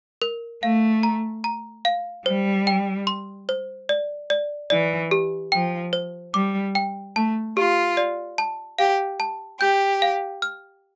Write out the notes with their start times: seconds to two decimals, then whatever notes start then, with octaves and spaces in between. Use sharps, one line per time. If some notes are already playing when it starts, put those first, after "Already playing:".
0.22 A#4
0.62 A3 F5
1.03 A#5
1.44 A#5
1.85 F5
2.25 G3 C5
2.67 G5
3.07 C6
3.49 C5
3.89 D5
4.30 D5
4.70 E3 D5
5.11 G4
5.52 F3 G5
5.93 C5
6.34 G3 D6
6.75 G5
7.15 A3 A5
7.56 F4 G4
7.97 D5
8.38 A5
8.79 G4 F5
9.20 A5
9.61 G4 G6
10.02 F5
10.42 F6